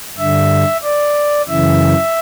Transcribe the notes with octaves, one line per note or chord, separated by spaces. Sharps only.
G2 D3 E5
D5
F#2 C#3 E3 E5